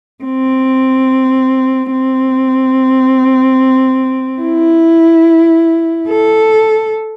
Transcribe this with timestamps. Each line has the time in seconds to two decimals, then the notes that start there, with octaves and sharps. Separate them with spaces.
0.24 C4
1.91 C4
4.41 E4
6.09 A4